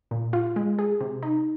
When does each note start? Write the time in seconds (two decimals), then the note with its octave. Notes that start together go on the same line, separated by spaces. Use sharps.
0.11 A#2
0.33 F4
0.56 G#3
0.79 G#4
1.01 C3
1.23 D#4